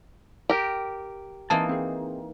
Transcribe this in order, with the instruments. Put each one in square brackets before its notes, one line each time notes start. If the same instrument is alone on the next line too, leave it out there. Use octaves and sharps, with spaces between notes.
[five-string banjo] G4 A#4
[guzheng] E3 A#3 D#4 [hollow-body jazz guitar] C4 A5
[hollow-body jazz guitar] C4 G#4